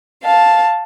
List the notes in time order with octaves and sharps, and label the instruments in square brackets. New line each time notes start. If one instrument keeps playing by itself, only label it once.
[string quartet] F5 A5